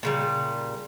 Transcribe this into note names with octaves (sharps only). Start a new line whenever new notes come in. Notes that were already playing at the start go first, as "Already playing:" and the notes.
A#2 C#3 G3